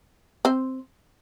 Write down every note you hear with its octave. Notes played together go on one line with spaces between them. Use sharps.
C4 C5